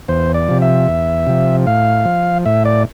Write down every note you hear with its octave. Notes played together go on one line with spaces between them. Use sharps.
E2 C5
D5
C3 F3
E5
E2
C3 F3
A2 F5
F3
A2 E5
D5